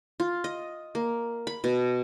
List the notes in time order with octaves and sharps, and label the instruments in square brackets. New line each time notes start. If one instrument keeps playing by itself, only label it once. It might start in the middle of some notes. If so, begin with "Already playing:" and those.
[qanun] F4
D#5
A#3
B5
B2